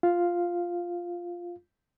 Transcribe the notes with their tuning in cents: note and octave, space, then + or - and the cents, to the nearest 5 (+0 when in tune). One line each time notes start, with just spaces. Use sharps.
F4 +0 F5 +0